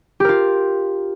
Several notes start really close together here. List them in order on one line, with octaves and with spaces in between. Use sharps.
G4 A#4 F4